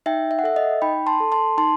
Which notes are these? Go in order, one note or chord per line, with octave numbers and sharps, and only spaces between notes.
D#4 E5 G5
E5
F#5
A4 E5
D#5
D#4 G5 B5
A5 C6
A4
A5 C6
D#4 A5 C6